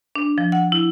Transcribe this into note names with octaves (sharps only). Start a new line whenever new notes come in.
D4
F3
F#5
E4